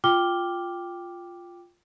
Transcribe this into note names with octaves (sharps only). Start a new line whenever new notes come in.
F4 G5 D6 F6 G7